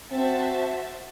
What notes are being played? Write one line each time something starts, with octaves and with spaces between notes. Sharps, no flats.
C4 F#4 C5 E5 A5